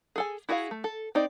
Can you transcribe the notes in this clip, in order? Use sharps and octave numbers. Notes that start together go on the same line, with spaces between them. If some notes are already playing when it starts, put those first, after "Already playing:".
G#4 A4 G#5
E4 F#4 G#4 C#5 F5
A3
A4
C4 D#4 D5